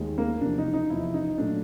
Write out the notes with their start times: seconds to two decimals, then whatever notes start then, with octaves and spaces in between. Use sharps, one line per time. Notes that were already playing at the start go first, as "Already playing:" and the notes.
Already playing: D#2 D#3 G#3
0.18 A#3
0.41 E2 C3 F3 D4
0.58 D#4
0.73 D#4
0.90 E2 C3 F3 E4
1.14 D#4
1.38 A#2 F#3 A3 D4